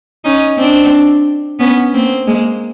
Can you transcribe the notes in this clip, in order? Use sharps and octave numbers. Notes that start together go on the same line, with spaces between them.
C#4 D#4
C4 D4
B3 C#4
A#3 C4
G#3 A#3